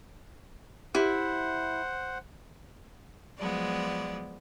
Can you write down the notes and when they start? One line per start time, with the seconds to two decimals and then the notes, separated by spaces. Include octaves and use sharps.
0.95 E4 G4 C5 F#5
3.38 F3 F#3 G#3 B3 D5